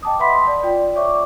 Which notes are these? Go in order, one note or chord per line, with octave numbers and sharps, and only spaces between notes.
D#5 G5 A5 D6 D#6
B4 E5 F#5 B5 C6 B6
C6
D5
F4 D5 G5
C#5 D5 E5 C#6 D6